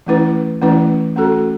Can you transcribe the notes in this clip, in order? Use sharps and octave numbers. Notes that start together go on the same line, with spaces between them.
E3 A3 C#4 E4 B4
E3 A3 C#4 E4 B4
A3 C#4 F#4 A4